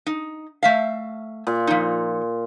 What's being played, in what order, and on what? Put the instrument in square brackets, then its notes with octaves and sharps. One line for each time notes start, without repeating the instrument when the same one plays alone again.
[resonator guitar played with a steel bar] D#4
A3 E5 F5
[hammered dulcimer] A#2
[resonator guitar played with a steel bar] F3 D#4